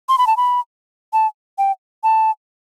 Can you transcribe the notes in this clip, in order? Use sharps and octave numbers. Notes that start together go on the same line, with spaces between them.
C6
B5
A5
B5
A5
G5
A5